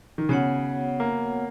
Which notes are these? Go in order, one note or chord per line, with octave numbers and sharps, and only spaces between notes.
D#3
C#3 B3 F#4 C#5 F#5
A#3